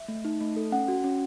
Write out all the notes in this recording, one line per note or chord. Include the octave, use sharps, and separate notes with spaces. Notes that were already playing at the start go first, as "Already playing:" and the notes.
Already playing: E5
A3
D#4
A3
A4
C#4 F#5
F#4
C#4